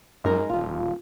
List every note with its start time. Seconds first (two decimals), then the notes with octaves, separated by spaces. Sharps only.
0.24 F#2 G#3 D#4 A#4
0.50 D#1 F2 F4